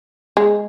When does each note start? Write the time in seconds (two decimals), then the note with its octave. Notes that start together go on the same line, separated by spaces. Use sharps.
0.37 G#3